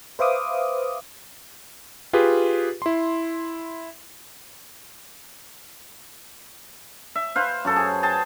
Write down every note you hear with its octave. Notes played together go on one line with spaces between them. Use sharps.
B4 C5 E5 F5 D6 D#6
F4 G4 G#4 B4
E4 C6
E5
B4 C5 F5
F#2 A4
G#4
G#4 G5 A5